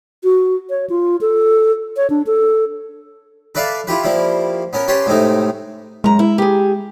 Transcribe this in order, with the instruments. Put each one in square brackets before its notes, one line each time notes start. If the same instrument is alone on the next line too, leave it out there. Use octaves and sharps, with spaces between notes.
[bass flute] F#4
C#5
F4
A4
C#5
D4
A4
[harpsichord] A4 B4 D5 E5 F5 A5
E4 F4 G4 B4
F3 G3 A#3 E4
B3 C#4 A#4
C#4 G4 B4 C#5 A5 C6
A2 C3 G#3 A3 D#4
[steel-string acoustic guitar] F#2 A#5 [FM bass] G#3
[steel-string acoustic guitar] E4
G4 G#4